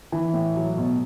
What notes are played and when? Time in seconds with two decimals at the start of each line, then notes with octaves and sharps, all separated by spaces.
0.12 E3
0.34 A2
0.56 F#3
0.77 B2